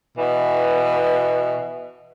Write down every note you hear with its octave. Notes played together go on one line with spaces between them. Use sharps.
B2 E3